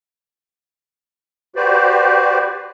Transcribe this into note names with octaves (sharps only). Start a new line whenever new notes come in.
F#4 G4 B4 C5 D5